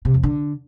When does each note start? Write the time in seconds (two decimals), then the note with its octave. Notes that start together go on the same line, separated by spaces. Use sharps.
0.05 C3
0.14 F2
0.23 D3